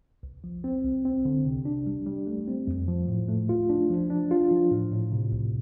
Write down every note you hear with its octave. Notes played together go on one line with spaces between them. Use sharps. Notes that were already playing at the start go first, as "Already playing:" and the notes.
C2
F3
C4
C2
C4
D3
C3
D4
G3
G3
A3
C4
F2
F3
A2
A3
F4
D4
F3
D4
F4
F3
A2
A2
C3
C2